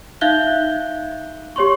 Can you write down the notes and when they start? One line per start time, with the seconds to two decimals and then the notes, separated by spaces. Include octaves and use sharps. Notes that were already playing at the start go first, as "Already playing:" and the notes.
0.21 D#4 E5 F5 F#6 G6 G7
1.56 G4 C#5 C6 C#6